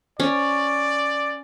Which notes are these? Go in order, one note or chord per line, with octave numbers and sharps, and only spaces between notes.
C#4 D5